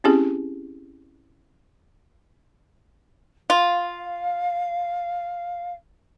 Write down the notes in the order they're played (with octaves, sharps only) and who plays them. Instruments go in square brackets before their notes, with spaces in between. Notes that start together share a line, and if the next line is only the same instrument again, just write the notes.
[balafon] C4 C#4 E4 G4 G#4
[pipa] F4 [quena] F5